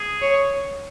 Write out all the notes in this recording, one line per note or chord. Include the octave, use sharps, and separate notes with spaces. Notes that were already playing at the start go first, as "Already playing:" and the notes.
Already playing: G#4
C#5